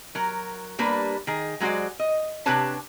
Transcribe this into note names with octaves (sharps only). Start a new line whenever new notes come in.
F#3 A#4
G3 A#3 D4 B4
D#3 G#4
F#3 G#3 F#4 C5 D5
D#5
C3 D4 G4 B4 C#5 A5